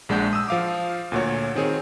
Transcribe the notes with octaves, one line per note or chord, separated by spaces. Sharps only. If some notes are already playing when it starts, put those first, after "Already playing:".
A#1 G#3 D4 F#5 G6
D#6 E6
F3 F5 D6
D2 A#2 F#4 C#5
D#3 C4 G#4 C#5